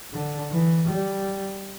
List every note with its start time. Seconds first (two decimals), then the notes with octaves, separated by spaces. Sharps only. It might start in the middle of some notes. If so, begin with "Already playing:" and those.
0.13 D3
0.51 E3
0.88 G3